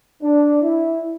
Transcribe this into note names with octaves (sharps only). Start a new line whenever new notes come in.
D4
E4